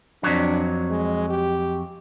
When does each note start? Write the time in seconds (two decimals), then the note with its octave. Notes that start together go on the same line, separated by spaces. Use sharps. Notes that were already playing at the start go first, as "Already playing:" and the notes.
0.23 F2 F#3 D4
0.90 G#3
1.30 G4